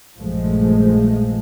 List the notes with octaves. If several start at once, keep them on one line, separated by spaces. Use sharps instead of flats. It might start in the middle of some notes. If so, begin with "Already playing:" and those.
A#1 G2 F3 G#3 A3